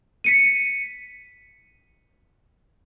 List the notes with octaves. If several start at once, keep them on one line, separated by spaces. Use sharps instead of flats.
B6 C#7 D#7